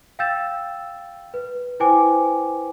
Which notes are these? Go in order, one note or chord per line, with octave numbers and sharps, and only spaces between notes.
F5 G5 E6 G6 A6 E7
B4
E4 B4 C5 G5 G#5 D6